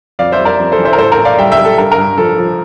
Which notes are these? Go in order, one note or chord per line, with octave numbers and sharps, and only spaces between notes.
F2 D5 F5
C5 E5
G3
A#4 D5
F2
A4 C5
E3
C5 E5
A#4
A2 A4 C5
A#4
A2
D5 F5
G3 E5 G5
E5 G5
G3
A4
G2 A#4
A#4
G2
F3 A4
F3